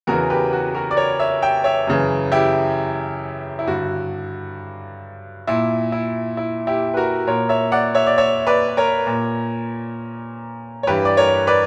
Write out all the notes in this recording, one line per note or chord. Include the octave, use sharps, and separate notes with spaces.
E2 C#3 E3 F#4 A#4
G4 B4
F#4
F#4 A#4
D5
A#4 C#5
C#5 E5
E5 G5
C#5 E5
F#2 C#3 E3
E4 G4
E4
G2 D3 F#4
A#2 E4
E4
E4
E4 G4
B4
F#4 A#4
A#2 A#4 C#5
C#5 E5
D5 F#5
C#5 E5
D5
C#5 E5
B4 D5
A#4 C#5
A#2
C#5
G2 E3 G4 B4
D5
A#4 C#5
B4 D5